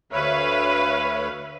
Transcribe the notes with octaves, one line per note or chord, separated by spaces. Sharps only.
D2 B4 C#5 E5 F5